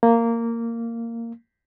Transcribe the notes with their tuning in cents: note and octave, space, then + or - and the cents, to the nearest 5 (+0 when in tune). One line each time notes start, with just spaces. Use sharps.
A#3 -15